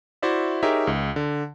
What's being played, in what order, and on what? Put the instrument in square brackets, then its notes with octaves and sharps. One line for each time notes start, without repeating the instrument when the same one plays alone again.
[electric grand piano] E4 F#4 C5 D5 E5
D#4 G4 G#4 A#4 C#5 E5
C#2
D3